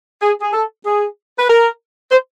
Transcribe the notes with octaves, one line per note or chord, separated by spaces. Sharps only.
G#4
G#4
A4
G#4
B4
A#4
C5